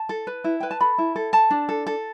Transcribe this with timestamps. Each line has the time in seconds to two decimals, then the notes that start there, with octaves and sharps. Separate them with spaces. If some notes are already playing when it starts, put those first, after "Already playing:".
Already playing: A5
0.09 A4
0.27 B4
0.44 E4
0.60 B4 G5
0.71 A5
0.80 A4 B5
0.98 E4
1.16 A4
1.33 A4 A5
1.51 D4
1.69 A4
1.87 A4